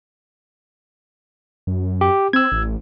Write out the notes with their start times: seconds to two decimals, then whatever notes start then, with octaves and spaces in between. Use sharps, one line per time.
1.67 F#2
2.01 G4
2.33 C4 E6 G#6
2.52 A1